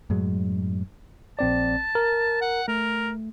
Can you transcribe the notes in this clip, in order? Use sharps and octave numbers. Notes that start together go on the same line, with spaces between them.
F#2 A2 F#3 G#3
A#1 C4 D5 A5
A#4
F#5
A3 A#4